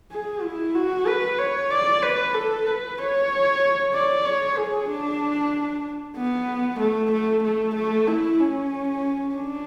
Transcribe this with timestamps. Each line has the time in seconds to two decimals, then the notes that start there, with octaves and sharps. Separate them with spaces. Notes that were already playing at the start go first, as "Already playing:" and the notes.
0.11 G#4
0.43 E4
0.75 F#4
1.07 B4
1.39 C#5
1.70 D5
2.02 B4
2.34 A4
2.66 B4
2.98 C#5
3.94 D5
4.25 C#5
4.57 G#4
4.89 D4
6.17 B3
6.80 A3
7.12 A3
7.44 A3
7.76 A3
8.08 E4
8.40 C#4
9.35 D4